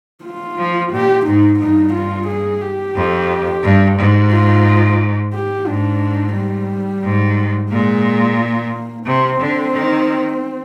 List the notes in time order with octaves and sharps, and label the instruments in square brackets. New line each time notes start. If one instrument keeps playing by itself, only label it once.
[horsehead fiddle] F4
[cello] F3
[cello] A#2 [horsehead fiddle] G4
[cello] G#2 [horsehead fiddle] D#4
[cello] G2 [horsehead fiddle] D#4
[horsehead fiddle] F4
G#4
G4
[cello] F2
G2
G#2
[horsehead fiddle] F4
G4
[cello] G#2 [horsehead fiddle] D4
[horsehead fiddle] G3
[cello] G#2
[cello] A#2 [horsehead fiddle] G#3
[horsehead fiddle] A#3
[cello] C3 [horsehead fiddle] C4
[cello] D3
D#3